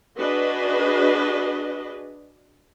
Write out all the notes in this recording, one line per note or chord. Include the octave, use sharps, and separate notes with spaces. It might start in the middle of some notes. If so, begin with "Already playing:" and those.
D4 F#4 G#4 B4 D#5